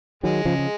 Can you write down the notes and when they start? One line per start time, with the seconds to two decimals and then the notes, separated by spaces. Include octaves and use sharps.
0.23 D#3 F#3 G#3
0.45 C#3 F3
0.59 F3